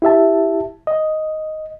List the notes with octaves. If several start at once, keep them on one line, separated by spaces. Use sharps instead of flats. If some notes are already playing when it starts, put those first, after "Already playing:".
E4 G4 E5 A5
D#5